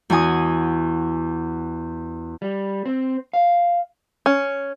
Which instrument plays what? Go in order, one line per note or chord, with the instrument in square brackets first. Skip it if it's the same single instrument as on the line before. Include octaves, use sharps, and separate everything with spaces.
[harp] E2 F#4 G#5 D#6
[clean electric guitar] G3
C4
F5
[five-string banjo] C#4